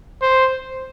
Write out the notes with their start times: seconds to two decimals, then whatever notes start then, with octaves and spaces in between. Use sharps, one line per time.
0.22 C5